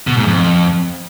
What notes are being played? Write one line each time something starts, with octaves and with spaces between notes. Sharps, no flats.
B2
G#2
F2